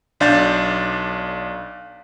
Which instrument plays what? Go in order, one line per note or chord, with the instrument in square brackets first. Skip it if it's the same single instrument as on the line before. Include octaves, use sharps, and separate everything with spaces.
[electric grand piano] B1 D4 F5 G6 A6